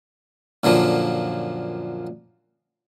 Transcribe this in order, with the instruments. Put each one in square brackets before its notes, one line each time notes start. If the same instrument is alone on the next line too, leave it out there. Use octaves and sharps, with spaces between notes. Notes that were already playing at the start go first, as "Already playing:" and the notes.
[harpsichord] F#2 A#2 D3 F3